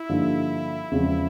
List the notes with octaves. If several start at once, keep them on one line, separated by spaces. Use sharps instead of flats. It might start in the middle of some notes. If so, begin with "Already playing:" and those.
Already playing: E4
G2 D3 F3 A#3 D#4
E2 C#3 F3 G#3 C4